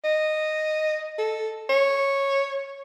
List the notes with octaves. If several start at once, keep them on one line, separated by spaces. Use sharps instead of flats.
D#5
A4
C#5